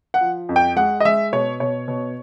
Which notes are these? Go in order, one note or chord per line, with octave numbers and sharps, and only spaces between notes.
F#5
F3
F2
G5
G#3 F#5
D#5
G#3 E5
B2 C#5
B2 C#5
B2